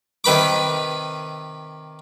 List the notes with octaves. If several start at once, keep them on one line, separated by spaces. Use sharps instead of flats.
C3 D#3 B4 B5 D6